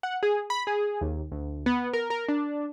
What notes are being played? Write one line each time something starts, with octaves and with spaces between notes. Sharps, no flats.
F#5
G#4
B5
G#4
D#2
D2
B3
A#4
A#4
D4